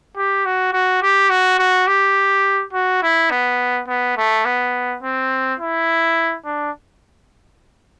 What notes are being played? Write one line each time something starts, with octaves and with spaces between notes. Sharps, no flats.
G4
F#4
F#4
G4
F#4
F#4
G4
F#4
E4
B3
B3
A3
B3
C4
E4
D4